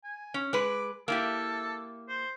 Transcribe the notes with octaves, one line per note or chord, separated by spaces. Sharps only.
G#5
C#4
G#3 B4 D6
A#3 E4 G4 A4
C5